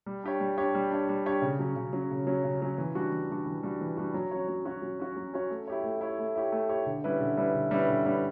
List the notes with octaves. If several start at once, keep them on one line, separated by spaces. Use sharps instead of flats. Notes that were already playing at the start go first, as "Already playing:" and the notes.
G3
D4 G4 C#5
G3
D4 G4 C#5
G3
D4 G4 C#5
G3
D4 G4 C#5
C#3
F#3 C#4
C#3
F#3 C#4
C#3
F#3 C#4
C#3
F#3 C#4
E3
G3 D4 F#4
E3
G3 D4 F#4
E3
G3 D4 F#4
E3
G3 D4 F#4
F#3
C#4 F#4 C#5
F#3
C#4 F#4 C#5
F#3
C#4 F#4 C#5
F#3
C#4 F#4 C#5
A3
E4 G4 C#5
A3
E4 G4 C#5
A3
E4 G4 C#5
A3
E4 G4 C#5
D3
G3 C#4 E4 B4
D3
G3 C#4 E4 B4
D3
G3 C#4 E4 B4
D3
G3 C#4 E4 B4